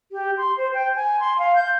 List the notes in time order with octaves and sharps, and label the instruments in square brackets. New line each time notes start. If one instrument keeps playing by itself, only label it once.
[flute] G4
C6
C5
G5
G#5
C6
F5
G6